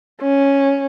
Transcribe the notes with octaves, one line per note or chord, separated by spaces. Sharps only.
C#4